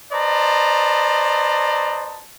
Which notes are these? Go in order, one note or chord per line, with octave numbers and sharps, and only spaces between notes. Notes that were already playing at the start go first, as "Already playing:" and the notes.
B4 C5 D5 D#5 A5 A#5